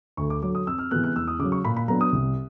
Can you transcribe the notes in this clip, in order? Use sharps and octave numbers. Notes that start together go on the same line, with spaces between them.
D2 C#6
D6
D3 F#3 D6
D#6
F2 E6
F6
C3 E3 G#3 B3 F#6
F#6
E2 E6
D#6
C#3 F#3 D6
C#6
A#2 B5
B5
F#3 B3 D4 A#5
D#6
C2